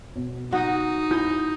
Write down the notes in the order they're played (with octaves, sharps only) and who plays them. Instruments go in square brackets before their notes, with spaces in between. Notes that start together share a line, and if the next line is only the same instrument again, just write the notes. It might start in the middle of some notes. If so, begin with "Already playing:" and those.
[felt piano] B2
[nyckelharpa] D#4 [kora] F#4
[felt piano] E4 G6